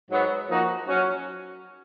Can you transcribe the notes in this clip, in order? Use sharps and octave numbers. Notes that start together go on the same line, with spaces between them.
G#2 F#3 B3
F3 A#3 D#4 F#4
F#3 C#4 F#4